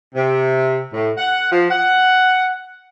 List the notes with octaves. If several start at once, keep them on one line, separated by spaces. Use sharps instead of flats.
C3
A2
F#5
F3
F#5